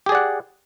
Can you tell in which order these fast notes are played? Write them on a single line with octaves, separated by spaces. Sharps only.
G4 G#4 D5 F#5